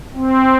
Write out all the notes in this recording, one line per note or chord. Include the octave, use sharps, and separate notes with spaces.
C4